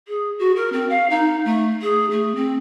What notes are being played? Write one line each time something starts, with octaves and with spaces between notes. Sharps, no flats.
G#4
F#4
A#4
C4
F5
D#4
A3
G#4
A3
C4